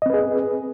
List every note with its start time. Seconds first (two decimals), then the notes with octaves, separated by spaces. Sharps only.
0.02 D#5
0.06 C4
0.10 B4
0.14 G#4